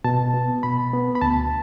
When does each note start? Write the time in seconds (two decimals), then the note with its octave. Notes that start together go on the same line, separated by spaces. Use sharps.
0.05 B2 A5
0.34 B3
0.63 B2 B5
0.93 B3
1.15 B5
1.22 D2 A5